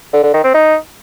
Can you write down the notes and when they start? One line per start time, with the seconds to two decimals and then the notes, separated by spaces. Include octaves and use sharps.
0.13 D3
0.23 D3
0.34 D#3
0.44 C4
0.54 D#4